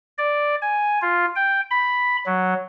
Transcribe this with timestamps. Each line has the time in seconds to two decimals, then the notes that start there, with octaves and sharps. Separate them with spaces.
0.18 D5
0.62 G#5
1.02 F4
1.36 G5
1.71 B5
2.26 F#3